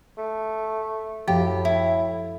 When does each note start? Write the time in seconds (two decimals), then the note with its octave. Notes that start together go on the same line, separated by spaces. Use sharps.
0.17 A3
1.28 F#2 A2 F3 G4
1.65 E4